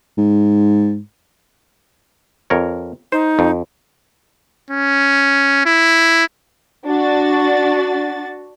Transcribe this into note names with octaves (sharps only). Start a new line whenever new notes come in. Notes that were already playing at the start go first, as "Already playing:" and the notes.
G#2
F2 A#4 C#5
D#4 C5
F2
C#4
E4
D4 F#4 A6